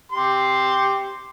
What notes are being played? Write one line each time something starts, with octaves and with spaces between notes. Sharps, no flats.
G4 C6